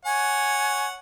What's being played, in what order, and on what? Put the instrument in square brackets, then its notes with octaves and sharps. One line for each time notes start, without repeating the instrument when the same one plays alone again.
[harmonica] C#5 F#5 [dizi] G#5